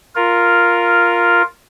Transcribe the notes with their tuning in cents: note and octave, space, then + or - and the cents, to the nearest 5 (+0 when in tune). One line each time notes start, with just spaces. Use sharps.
F4 +0 A#4 +0